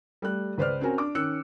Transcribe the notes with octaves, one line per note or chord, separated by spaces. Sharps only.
G3 A3 F#6
C#2 B4 C5 D5 F6
C4 C#4 F#4 A#4 G#5
D4 D6
D#3 C#4 E6 F#6 C#7